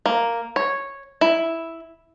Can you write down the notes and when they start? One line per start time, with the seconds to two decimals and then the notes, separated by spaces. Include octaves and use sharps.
0.06 A#3
0.56 C#5
1.21 E4